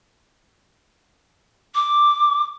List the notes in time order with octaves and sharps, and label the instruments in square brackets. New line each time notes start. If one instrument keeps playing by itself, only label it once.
[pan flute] D6